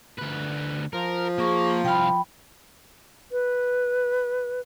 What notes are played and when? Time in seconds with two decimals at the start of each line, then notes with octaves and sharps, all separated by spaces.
0.18 D2 B4
0.93 F3 A#4
1.38 A#3 G#4 C#6
1.85 C2 F5 G5 B5
3.32 B4